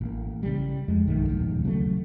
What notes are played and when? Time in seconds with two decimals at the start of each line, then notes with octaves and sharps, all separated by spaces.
0.01 A1 A#3
0.43 C#3 G3
0.88 F2 G#3 A3
1.07 B1 G2 D#3 A3
1.29 E1 A#1 D#2
1.64 C#3 F#3 G3 A3